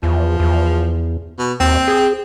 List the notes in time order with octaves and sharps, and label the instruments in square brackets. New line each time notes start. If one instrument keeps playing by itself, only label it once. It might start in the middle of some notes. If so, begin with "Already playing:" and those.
[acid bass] E2 [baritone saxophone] F3
[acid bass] E2
[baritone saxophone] B2
[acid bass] D#2 [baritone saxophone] C4
[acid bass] G#4